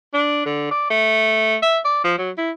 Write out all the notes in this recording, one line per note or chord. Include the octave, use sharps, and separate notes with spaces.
D4
D3
D5
A3
E5
D5
F3
F#3
E4